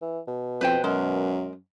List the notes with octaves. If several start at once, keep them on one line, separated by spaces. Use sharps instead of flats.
E3
B2
F2 B4 C5 G5
F#2 G#3 A#4